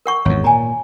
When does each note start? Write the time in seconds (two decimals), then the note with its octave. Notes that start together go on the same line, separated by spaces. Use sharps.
0.06 A#4 F#5 C#6
0.25 G#1 E2 C#5
0.44 A#2 G#5 A#5